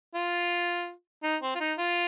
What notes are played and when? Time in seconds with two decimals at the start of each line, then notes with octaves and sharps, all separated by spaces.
0.15 F4
1.23 D#4
1.42 C4
1.55 F4
1.60 D#4
1.78 F4